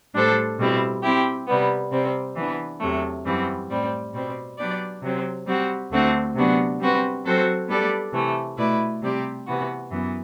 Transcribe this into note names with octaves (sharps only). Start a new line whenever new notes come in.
A2 G3 D4 A4 C5
B2 G3 C4 E4
G3 C4 E4 G4
C3 G3 B3
C3 G3 C4
E3 B3 D4
E2 C3 F#3 A3
F#2 E3 G3 C4 F#4
A2 G3 C4
B2 G3 C4
F#3 B3 D4 G4 D5
C3 F#3 C4
G3 C4 F#4
D2 D3 A3 C4 F#4
C3 F#3 B3 D4 F#4
G3 C4 F#4 B4
F#3 C4 F#4 A4 C5
G3 B3 D4 A4 D5
C3 E3 A3
B2 A3 E4 B4 D5
C3 G3 C4 G4 D5
C3 E3 B3 F#4
F#2 E3 B3